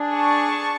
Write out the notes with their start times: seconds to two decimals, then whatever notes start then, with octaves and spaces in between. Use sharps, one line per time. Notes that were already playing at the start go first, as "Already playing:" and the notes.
Already playing: D4 G#4
0.15 A5 C#6